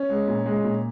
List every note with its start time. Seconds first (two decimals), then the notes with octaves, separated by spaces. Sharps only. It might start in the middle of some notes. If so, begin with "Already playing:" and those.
Already playing: C#4
0.10 G#3
0.27 A#2
0.46 G#3
0.64 A#2